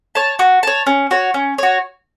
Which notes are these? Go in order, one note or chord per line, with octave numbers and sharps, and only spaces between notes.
C#5 A5
F#4
C#5 A5
C#4
F#4 C#5
C#4
F#4 C#5